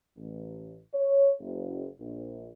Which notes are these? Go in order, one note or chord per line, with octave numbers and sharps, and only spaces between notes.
A1
C#5
F#1
A#1